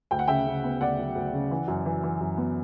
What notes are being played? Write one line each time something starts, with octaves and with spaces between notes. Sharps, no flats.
D2 G5
F#5
C#3 E5 G5
C#3
B3
D2 D5 F#5
F#3
D2
C#3
E3
F#2
E3
E3
F#2
B3